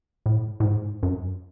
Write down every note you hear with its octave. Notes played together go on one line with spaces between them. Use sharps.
A2
A2
G#2
F#2